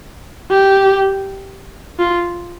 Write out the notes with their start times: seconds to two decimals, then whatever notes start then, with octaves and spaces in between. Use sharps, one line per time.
0.50 G4
1.99 F4